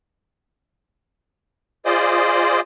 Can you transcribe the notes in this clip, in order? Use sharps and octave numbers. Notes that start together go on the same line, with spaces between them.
F4 G#4 C5 D5 D#5